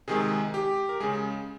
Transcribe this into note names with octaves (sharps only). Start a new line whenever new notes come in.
C3 D#3 G#3 G#4
G4
A#4
C#3 G#3 G#4